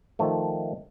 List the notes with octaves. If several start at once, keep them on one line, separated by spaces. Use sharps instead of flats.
D#3 F3 A3